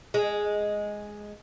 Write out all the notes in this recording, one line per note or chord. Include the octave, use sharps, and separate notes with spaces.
G#3